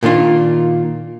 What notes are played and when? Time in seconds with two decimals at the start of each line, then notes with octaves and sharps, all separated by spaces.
0.03 A#2 D#3 D4 F4